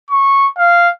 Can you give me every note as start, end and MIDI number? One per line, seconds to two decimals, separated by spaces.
0.11 0.48 85
0.58 0.90 77